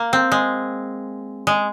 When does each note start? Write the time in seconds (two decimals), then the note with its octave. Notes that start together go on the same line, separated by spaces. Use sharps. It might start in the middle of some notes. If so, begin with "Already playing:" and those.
Already playing: A#3
0.13 C4
0.32 G#3
1.47 G#3